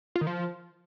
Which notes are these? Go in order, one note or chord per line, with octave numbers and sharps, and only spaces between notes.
F4
D#3
F3